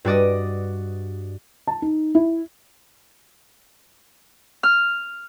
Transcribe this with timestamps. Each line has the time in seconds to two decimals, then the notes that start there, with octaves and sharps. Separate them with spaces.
0.05 G2 F#4 D5 D#5
1.67 A5
1.82 D#4
2.15 E4
4.63 F6